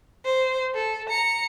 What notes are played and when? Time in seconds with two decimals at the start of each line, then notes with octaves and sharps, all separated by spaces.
0.25 C5
0.75 A4
1.09 A#5 C#7